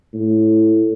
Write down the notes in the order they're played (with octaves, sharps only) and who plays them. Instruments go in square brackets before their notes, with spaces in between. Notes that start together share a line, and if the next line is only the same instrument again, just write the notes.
[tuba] A2